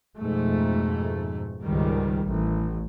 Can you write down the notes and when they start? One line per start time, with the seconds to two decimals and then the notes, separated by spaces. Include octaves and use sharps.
0.19 F2 G#2 B2 A3
1.62 C#2 G#2 D#3 G3
2.26 A1